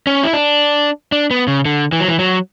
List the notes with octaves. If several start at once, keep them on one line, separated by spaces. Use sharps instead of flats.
C#4
E4
D4
D4
B3
C#3
D3
E3
F#3
E3
F#3